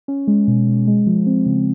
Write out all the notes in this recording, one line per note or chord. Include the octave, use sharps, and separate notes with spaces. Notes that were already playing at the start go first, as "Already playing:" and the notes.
C#4
G#3
B2
B2
G#3
F3
C4
C#3